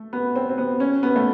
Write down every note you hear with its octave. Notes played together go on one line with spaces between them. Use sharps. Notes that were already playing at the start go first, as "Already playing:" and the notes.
Already playing: A3
B3
C4
C4
B3
C#4
B3
A3